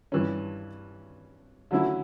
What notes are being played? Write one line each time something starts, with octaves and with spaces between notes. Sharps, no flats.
G2 E3 G3 C#4
D3 F#3 A3 C#4 E4